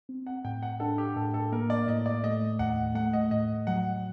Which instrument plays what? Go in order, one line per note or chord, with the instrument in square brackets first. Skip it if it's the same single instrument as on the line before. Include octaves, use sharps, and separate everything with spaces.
[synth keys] C4
[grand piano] F#5
[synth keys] A2 [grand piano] G5
[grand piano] F#5
[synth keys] D4 [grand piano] A4
[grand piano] G4
[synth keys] A2 [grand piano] A4
[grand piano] A4
[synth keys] A#3 [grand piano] A#4
[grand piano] D5
[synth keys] A2 [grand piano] D#5
[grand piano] D5
[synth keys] A3 [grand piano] D#5
[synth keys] D#2 [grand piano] F#5
[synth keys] A3 [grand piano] F#5
[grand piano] D#5
[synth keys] A2 [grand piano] D#5
[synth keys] F#3 [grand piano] F#5